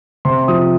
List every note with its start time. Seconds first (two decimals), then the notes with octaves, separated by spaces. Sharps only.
0.25 C3 C6
0.48 F3 D#6